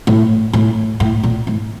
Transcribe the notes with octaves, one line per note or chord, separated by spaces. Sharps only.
A2
A2
A2
A#2
A2